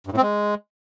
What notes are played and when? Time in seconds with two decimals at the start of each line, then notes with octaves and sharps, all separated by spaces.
0.07 G2
0.12 A2
0.17 C4
0.22 G#3